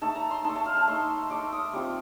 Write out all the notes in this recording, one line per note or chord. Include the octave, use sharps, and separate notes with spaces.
A3 D#4 A5
A#5
C6
A3 D#4 A5
A5
F5
A5
A3 D#4 C6
A3 D#4 D6
D#6
G3 C4 F4 D6